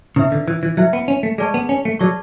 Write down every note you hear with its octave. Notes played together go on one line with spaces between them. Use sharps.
C#3 E4 B4 E5
D3
E3
E3
F#3 E4 B4 E5
B3
C#4
A3
G#3 G#4 B4 D5 A5 C#6
B3
C#4
A3
F#3 G#4 B4 D5 A5 C#6